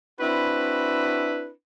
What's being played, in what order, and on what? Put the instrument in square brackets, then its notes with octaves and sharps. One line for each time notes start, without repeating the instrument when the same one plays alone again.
[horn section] C4 D4 E4 F#4 B4